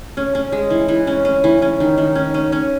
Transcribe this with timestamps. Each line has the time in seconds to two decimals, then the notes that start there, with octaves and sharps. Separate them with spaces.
0.17 C#4
0.35 C#4
0.52 G#3
0.70 E3
0.88 E3
1.07 C#4
1.25 C#4
1.44 E3
1.62 C#4
1.80 D#3
1.98 D#3
2.15 C#4
2.34 C#4
2.52 C#4